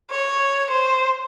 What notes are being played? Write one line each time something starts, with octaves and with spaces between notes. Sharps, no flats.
C#5
C5